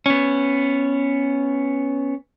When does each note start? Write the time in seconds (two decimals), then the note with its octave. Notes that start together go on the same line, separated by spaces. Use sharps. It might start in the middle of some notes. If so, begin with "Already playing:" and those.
0.06 B3 C#4